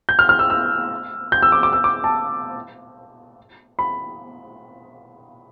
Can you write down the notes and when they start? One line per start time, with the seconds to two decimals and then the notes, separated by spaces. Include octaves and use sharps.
0.09 G6
0.19 F6
0.29 F6
0.39 E6
0.50 E6
1.32 G6
1.42 E6
1.52 D6
1.63 D6
1.73 E6
1.84 D6
2.04 A5
3.79 B5